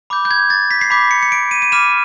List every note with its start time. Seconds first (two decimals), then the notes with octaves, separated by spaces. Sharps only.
0.10 B5 D6 G6
0.25 G6
0.31 G#6
0.50 A6
0.71 B6
0.81 C7
0.90 B5 D6 G6 B6
1.11 C#7
1.23 C#7
1.32 D7
1.51 D#7
1.62 D#7
1.72 B5 D6 F6 E7